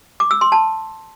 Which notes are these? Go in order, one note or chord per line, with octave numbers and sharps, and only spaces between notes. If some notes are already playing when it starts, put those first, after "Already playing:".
D6
E6
C6
A5